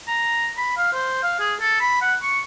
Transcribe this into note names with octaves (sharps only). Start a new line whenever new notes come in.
A#5
B5
F5
C5
F5
G#4
A4
B5
F#5
C#6